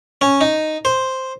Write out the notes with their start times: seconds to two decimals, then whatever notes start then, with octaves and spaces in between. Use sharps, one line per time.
0.21 C#4
0.41 D#4
0.85 C5